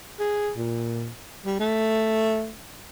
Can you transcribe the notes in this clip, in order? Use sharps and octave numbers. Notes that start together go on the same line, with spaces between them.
G#4
A#2
G3
A3